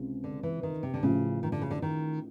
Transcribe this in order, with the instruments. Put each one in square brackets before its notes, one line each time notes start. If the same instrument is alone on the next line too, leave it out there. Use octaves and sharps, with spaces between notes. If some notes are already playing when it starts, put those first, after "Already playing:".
Already playing: [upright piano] C#2 C3
[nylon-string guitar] D3
E3
D#3
C3
D3
[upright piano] A1 A2 F3 [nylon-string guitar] C#3
[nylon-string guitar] D#3
D3
C#3
D3
D#3